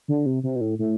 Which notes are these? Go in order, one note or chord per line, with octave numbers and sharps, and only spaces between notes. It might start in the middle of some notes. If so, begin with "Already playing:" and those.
D3
C3
C3
B2
A2
A2